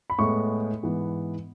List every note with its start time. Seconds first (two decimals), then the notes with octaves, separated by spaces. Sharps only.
0.10 B5
0.19 A2 G#3 B3 C#6
0.83 G#2 E3 B3